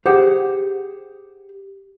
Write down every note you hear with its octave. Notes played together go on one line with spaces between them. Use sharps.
G4 G#4 C5 F#5